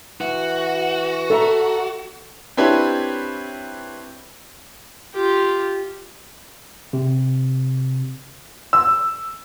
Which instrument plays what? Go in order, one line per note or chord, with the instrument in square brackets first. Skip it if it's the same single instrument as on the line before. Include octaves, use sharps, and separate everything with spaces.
[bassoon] E3 [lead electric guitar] F#4
[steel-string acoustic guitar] A4 E5 A#5
[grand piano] C4 D4 E4 G4 B4 C#5
[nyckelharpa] F4 G4
[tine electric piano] C3
[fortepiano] E6